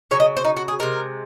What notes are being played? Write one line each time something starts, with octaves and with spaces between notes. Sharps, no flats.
C#3 F#3 C#5
D#5
C5
D#4
F#4
G#4
C3 F3 G#3 A#4